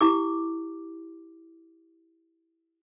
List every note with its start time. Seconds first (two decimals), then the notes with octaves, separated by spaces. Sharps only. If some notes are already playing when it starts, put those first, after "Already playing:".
0.01 E4 G4 D6